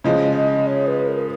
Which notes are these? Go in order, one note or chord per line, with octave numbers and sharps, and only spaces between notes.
C#3 F3 G#3 D#5
D#5
C#5
B4
A#4